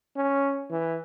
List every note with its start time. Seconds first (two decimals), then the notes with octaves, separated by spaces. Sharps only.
0.16 C#4
0.70 E3